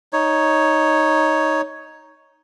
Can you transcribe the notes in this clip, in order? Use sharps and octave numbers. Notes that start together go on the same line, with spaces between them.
D#4 C#5